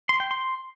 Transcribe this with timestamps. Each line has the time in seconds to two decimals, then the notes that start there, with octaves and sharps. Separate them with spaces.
0.09 C6
0.20 G5
0.31 C6